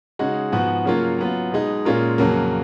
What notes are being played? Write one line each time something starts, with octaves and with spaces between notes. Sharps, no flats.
C#3 G#3 D#4 F#4
G#2 F3 B3 F#4
C#3 F#3 A#3 C#4 F4
F#3 B3 F4
B2 G#3 D#4
A#2 G#3 C#4 F4 A#4
F2 C#3 F#3 A#3